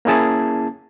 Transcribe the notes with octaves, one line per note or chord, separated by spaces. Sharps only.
A#3 C#4 E4 G#4 A5